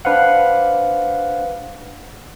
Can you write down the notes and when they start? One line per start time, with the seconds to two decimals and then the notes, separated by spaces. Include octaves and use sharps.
0.05 D4 B4 C5 F5 F#5